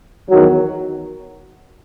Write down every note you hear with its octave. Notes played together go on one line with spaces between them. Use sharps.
E2 D#3 F#3